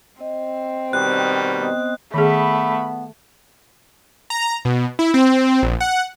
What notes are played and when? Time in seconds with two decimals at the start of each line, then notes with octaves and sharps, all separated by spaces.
0.21 C4 D#5
0.93 B2 D#3 G3 G5 F#6
1.58 B3 D#5 D#6
2.14 D#3 A3 B3 G#4 B5
4.30 A#5
4.65 B2
4.99 E4
5.14 C4
5.63 A#1
5.81 F#5